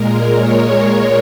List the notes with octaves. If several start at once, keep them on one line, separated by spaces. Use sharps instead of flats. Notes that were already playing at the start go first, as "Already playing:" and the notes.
Already playing: A#2 G#3 A#4
C#5